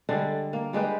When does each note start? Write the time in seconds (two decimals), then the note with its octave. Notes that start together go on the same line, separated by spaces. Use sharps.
0.09 D3 G3 G#3 D4
0.53 A#3
0.73 G3 G#3 G4 B4